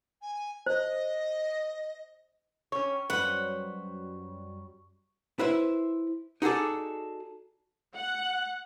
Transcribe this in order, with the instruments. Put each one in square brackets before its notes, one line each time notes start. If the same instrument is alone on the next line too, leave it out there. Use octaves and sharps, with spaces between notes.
[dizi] G#5
[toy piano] C5 [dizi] D#5
[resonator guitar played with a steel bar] C#4 C#5 [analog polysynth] G4 [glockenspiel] C#6
[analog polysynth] F#2 F#3 G3 [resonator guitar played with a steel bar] B4 C5 [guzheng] F#5
[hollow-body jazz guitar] E4 B4 C5 E5
D#4 F#4 G#4 A4 D5
[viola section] F#5